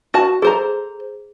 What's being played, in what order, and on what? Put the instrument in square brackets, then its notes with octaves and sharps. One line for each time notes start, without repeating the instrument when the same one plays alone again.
[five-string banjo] F#4 A5
[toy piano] G#4 [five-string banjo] A4 C5 A#5